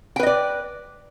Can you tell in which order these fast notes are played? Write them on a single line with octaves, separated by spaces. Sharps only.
G5 B4 D#5 D5